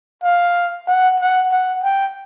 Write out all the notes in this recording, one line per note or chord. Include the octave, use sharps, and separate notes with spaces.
F5
F#5
F#5
F#5
G5